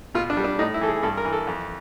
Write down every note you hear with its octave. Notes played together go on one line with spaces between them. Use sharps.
B2 F4
D4
G3
D4
A2 D#4
E4
E3 A4
G#4
G2 A4
A#4
E3
A4
F2